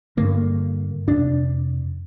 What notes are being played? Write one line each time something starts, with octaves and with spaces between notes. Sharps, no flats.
G2 D3 A#3
F2 C3 D4